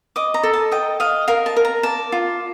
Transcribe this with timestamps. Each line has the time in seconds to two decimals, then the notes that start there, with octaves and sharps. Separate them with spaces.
0.16 D#5 D6
0.34 A#5
0.43 A4
0.53 A5
0.72 D#5 G5
1.00 D#5 F5
1.28 A#4 F5
1.46 A5
1.57 A#4
1.65 A#5
1.83 D5 A5
2.12 F4